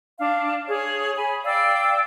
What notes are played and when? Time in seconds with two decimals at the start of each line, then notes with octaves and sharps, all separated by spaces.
0.19 D4 F5
0.67 G#4 C#5
1.15 G#5 B5
1.44 D5 F5 G5 E6